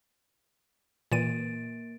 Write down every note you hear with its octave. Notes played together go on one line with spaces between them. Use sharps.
A#2 E3 A#3 A6 D7 D#7